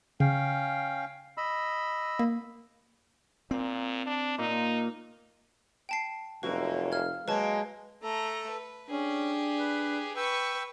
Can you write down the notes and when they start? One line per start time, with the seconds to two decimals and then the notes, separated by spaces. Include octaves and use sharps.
0.20 C#3 C#4 F5 G5
1.37 D#5 B5 E6
2.19 A#3
3.51 A#2 C4
4.06 D4
4.38 A#2 D#4
5.89 G5 A5 C7
6.43 F1 F#2 A#3 F#4 B4
6.92 F5 F6 G#6
7.28 F#3 G#3 A#3 B4 A5
8.03 A3 A4 A#5
8.50 B4
8.91 C#4 D4 G4 G#4
9.59 B4
10.16 B4 G5 C#6 E6